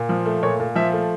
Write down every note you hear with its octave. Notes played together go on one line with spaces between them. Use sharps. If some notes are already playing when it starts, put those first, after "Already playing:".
Already playing: A#2
F3
A3
A#2 C#5
A#2
F3 E5
A3